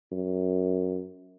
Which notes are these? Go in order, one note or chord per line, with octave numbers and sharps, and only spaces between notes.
F#2